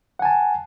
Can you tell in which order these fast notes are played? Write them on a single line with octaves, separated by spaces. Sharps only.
F#5 G#5 A5